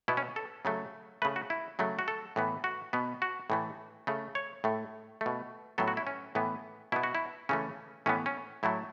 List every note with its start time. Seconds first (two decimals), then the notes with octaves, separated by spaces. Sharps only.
0.08 B2 B3 E4
0.17 C#4
0.36 A4
0.65 C#3 F#3 A3
1.22 C#3 A3 B4
1.36 F#4
1.50 E4
1.79 C#3 F#3 A3
1.99 F#4
2.08 A4
2.36 A2 E3 B3
2.64 F#4
2.93 B2 B3
3.22 F#4
3.50 A2 E3 A3
4.07 C#3 A3
4.35 C#5
4.64 A2 A3
5.21 A3
5.26 B2
5.78 A2 F#3 B3 A4
5.88 F#4
5.97 E4
6.07 C#4
6.35 A2 E3 B3
6.92 B2 B3 E4
7.03 F#4
7.15 E4
7.49 C#3 E3 A3 C#4
8.06 A2 E3 B3 C#4
8.26 C#4
8.63 A2 F#3 A3 E4